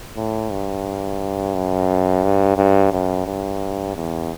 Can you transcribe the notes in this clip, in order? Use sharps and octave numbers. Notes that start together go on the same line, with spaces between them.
A2
G2
F#2
G2
G2
F#2
G2
E2